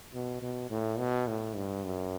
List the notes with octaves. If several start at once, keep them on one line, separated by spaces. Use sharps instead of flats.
B2
B2
A2
B2
A2
G2
F#2